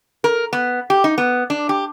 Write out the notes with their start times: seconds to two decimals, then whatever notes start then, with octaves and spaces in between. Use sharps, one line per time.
0.24 A#4
0.53 B3
0.90 G4
1.04 D#4
1.18 B3
1.50 D4
1.69 G4